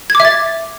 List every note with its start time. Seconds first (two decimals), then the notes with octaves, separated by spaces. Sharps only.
0.10 G#6
0.15 D6
0.20 E5
0.25 A6